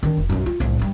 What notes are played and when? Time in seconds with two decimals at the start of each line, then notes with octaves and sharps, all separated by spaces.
0.03 D#3 D4
0.17 F1
0.29 B1 F#2
0.46 F4
0.60 C2 A2
0.79 G2 G3